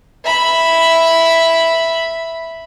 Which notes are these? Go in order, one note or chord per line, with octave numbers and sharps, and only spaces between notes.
E5 B5